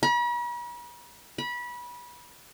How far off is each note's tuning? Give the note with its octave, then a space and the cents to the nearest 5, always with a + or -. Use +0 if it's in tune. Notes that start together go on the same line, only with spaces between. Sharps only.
B5 -45
B5 -25